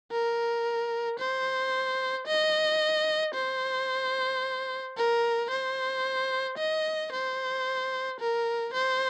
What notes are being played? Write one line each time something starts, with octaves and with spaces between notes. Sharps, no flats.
A#4
C5
D#5
C5
A#4
C5
D#5
C5
A#4
C5